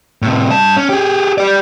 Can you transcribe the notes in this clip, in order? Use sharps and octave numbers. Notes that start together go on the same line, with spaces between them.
A2 C3
G2 A5
C#4
G4 G#4
G4 D5